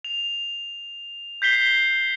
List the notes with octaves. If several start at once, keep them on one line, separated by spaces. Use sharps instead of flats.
F7
G6 B6 C7 G7